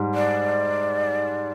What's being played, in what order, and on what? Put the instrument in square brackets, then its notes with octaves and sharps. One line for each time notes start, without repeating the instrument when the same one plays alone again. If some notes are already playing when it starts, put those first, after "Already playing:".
Already playing: [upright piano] G#2 G3
[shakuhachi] D5